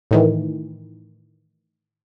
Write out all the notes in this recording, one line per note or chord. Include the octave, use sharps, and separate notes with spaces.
A2 D#3 E3